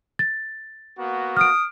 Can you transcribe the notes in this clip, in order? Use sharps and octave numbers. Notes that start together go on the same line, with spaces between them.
A6
A#3 B3 F#4
D#6 F6 D7